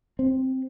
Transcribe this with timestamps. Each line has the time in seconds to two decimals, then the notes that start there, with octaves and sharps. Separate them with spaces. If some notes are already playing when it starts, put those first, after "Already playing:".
0.19 C4